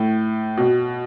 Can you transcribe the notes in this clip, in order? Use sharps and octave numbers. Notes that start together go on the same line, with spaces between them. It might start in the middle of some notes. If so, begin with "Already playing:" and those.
Already playing: A2
B2